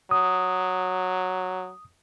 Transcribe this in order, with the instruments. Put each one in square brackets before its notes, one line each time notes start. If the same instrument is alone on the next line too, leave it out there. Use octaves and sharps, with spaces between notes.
[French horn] F#3 [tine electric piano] D#6